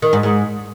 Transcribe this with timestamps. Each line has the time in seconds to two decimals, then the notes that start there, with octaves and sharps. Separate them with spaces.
0.02 D#3
0.13 G#2
0.23 G#2